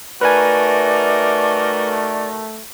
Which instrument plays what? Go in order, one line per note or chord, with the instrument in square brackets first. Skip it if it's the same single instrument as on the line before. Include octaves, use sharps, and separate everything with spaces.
[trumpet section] A3 [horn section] D#4 F#4 A#4 [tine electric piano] B4 G#5 [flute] D5